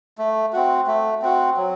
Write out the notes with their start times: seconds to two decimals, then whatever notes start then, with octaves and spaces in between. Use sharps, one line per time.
0.18 A3
0.53 C4 F#4
0.87 A3
1.22 C4 F#4
1.57 F#3